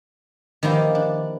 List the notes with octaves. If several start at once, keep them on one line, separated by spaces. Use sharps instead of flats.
D#3 F3 A#3 E4 G4
D4